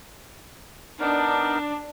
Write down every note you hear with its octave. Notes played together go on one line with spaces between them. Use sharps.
B3 D4 D#4 A#4